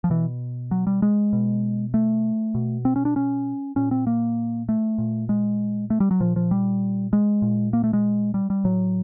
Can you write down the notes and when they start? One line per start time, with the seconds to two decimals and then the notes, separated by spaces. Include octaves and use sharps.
0.04 F3
0.10 B2 E3
0.71 F#3
0.87 G3
1.02 G#3
1.33 B2
1.94 A3
2.55 B2
2.85 C4
2.96 C#4
3.05 D4
3.16 C#4
3.76 A#2 C#4
3.91 C4
4.07 A#3
4.69 A3
4.98 A#2
5.29 G#3
5.90 A3
6.00 G3
6.11 F#3
6.20 A#2 F3
6.36 F3
6.51 G3
7.13 G#3
7.42 A#2
7.73 A#3
7.84 A3
7.93 G#3
8.34 G3
8.50 G3
8.64 A2 F#3